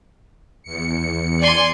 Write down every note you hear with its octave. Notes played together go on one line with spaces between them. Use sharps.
E2 C#7
D5 G#5 C6